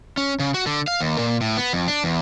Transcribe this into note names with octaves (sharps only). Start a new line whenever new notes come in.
C#4
C#3
F#4
D3
F5
D#2
A#2
A2
B3
F2
D4
E2